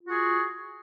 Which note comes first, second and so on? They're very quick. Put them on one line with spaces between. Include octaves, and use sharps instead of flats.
F4 F#4 G#4